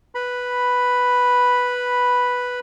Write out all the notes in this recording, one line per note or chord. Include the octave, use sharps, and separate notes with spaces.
B4 B5